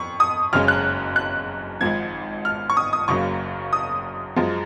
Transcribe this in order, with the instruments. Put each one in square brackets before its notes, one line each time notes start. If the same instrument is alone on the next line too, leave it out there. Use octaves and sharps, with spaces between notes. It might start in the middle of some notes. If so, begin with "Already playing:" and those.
Already playing: [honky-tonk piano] F2 C#6
D#6
F#1 F#2 C#3 G#3 C#4 F6
F#6
F#6
G#1 G#2 F3 G#6
F6
C#6
D#6
D#6
F#1 F#2 C#3 F#3 A#3 C#6
D#6
F#2 F3 G#3